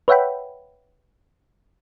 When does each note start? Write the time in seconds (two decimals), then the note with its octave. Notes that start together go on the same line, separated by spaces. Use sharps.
0.08 B4 C#5 E5 F#5 G5 B5